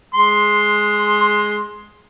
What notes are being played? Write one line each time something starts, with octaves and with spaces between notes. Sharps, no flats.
G#3 C6